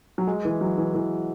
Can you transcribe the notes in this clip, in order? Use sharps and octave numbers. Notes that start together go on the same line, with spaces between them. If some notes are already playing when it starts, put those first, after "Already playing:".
F#3
G#3
E3
F#3
E3
E3